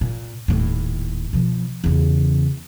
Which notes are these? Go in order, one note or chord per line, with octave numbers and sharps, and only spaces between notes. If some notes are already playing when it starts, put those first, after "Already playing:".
A#2
D#1 A2
B2 F3
E2 C#3